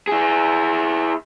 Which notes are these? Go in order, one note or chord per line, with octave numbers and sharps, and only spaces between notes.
E4 G#4